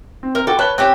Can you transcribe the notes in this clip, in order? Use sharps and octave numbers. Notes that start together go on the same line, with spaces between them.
C4
A#4
F#4 A4 G5 D6
B4 C#5 A5 F#6 G7
C4 C#4 G4 F#6